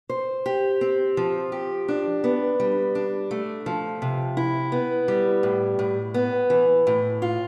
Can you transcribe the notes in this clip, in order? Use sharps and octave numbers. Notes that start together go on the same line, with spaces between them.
C5
G4
C4
F3
G4
D4
B3
G3
D4
A3
F3
C3
E4
B3
G3
A2
A2
B3
E3
A2
F4